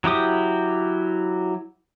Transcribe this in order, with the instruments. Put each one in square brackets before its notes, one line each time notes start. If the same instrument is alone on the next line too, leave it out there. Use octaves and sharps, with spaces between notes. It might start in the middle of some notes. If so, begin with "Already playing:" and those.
[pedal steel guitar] F#3 E4 G4 D#6